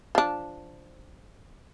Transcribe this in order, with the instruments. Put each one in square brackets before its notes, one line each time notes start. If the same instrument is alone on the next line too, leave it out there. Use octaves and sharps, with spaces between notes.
[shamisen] F3 D4